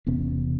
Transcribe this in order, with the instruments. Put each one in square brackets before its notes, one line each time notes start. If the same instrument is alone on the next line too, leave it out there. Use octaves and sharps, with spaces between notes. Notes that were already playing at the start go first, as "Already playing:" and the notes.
[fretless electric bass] E1 E2 C3 B3 C#4